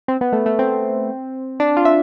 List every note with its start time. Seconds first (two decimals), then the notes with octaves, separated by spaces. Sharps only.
0.08 C4
0.21 B3
0.33 A3
0.46 A3
0.59 C4
1.60 D4
1.77 F4
1.85 E5